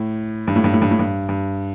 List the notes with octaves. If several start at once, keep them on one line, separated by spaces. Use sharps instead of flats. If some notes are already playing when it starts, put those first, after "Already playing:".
Already playing: A2
G2
A2
G2
A2
G2
A2
G2
G2